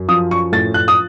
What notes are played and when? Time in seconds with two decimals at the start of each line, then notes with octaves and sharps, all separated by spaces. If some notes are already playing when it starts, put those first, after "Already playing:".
Already playing: F#2
0.09 F3 D#6
0.31 C#6
0.52 A2 A6
0.74 F#6
0.88 D#6